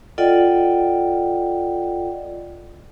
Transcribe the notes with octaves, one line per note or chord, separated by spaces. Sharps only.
F4 A4 D5 D#5 F#5 G5